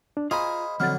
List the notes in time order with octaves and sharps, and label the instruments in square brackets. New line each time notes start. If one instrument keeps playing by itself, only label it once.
[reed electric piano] D4
[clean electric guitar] F4 G#5 A#5 [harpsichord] G#4 C5 F5 [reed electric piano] D#5 B5
[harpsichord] D3 F#3 [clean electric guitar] F3 C4 [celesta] F6 A6